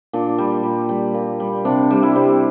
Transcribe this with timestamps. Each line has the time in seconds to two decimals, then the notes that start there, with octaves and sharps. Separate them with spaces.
0.13 A#2 D4
0.38 G3
0.63 A#2
0.89 G3
1.14 A#2
1.40 G3
1.65 C3 D4
1.91 G3
2.03 E4
2.16 C3